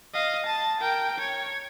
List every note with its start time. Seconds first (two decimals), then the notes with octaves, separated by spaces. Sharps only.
0.14 D#5 F5
0.46 A5
0.81 A#4 G5
1.18 C#5